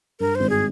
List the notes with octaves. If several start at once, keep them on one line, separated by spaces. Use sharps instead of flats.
G2 A#4
G#1 C5
G#4